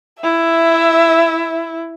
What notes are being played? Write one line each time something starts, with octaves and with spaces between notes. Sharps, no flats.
E4 E5